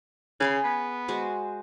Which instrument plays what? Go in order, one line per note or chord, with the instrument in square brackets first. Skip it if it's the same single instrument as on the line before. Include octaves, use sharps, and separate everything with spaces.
[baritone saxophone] C#3 [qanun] G#4 B5 C6
[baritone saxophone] B3
[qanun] G#3 F#4 C5